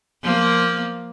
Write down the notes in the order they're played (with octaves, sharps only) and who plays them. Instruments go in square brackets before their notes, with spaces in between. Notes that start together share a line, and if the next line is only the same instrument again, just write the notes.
[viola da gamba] F3 A#3